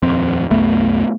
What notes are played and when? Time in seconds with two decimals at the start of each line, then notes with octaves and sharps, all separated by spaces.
0.03 D#1 F2 C4
0.51 C2 F#2 A3 B3